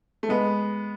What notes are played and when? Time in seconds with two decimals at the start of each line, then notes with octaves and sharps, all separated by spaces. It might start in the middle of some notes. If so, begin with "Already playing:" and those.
0.23 A3
0.29 G#3 B3